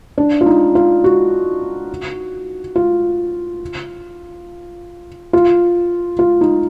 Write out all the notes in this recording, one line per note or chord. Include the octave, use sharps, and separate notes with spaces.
D4
F4
D#4
F4
F#4
F4
F4
F4
D#4